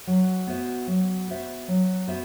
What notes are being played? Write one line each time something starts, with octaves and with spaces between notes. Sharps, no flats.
F#3
B3 F#4 C5 E5
F#3
B3 F#4 C5 E5
F#3
B3 F#4 C5 E5